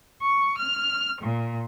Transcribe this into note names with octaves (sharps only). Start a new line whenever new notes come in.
C#6
F6
A#2